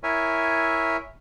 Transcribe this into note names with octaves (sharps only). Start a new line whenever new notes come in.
E4 A#4 C#5 E5 G#5